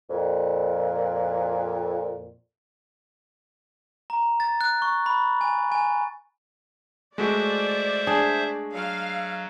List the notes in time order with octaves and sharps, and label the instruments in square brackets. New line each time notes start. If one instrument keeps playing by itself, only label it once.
[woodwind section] F2 A#2
[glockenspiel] A#5
A6
F#6
C#6
B5
G#5
G#5
[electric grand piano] G#3 A3 F#4 [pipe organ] C5 E5 [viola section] D5
[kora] D4 G#4
[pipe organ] F#3 [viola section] F5